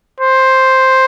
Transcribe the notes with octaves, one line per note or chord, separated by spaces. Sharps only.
C5